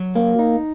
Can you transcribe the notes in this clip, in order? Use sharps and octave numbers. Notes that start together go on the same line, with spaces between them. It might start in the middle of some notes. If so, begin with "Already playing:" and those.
Already playing: F#3
A#3
D#4